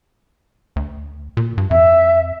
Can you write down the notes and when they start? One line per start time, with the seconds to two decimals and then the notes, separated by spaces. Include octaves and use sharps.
0.76 D2
1.37 A#2
1.58 G2
1.71 F2 E5